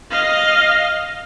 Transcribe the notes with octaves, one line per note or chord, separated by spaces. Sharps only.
D#5 F5